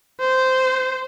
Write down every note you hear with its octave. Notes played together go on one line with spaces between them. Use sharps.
C5